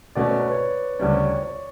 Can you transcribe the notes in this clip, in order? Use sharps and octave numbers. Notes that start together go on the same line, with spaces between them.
B2 A3 C#4 F#4 D5
C#5
B4
C#5
D2 C#3 G3 C#4 D5
C#5
C#5
C#5